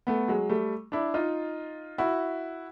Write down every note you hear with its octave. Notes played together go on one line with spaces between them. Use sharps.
A3 B3
F#3 G#3
G3 A3
D4 E4
D#4 F4
E4 F#4